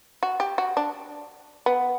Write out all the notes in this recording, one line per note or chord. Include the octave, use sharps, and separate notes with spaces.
F#4
G4
F#4
D4
B3